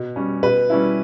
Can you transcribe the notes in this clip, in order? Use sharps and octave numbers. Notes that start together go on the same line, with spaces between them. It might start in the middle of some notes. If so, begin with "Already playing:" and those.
Already playing: B2
G3 C#4
B2 B4
G3 C#4 E4